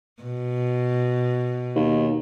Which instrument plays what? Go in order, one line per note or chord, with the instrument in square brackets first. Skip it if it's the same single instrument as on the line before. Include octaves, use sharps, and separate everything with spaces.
[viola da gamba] B2
[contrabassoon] D#2